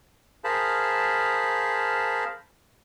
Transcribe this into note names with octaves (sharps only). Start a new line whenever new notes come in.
G#4 A#4 C5 F5 A5 B5